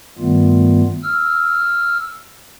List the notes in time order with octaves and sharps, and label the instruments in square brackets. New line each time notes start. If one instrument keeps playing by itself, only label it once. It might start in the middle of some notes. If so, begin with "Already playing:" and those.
[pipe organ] G2 D#3 G3 A3 B3 F4
E6 F6